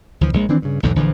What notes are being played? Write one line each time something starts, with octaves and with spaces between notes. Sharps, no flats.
D2 E3 F3
A#1 G#3
D#3 E3 C4 D4
G2 C#3
B1 E2 G#2 D3
A#1 D3 E3 F3